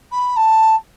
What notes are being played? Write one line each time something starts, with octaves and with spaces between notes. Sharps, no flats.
B5
A5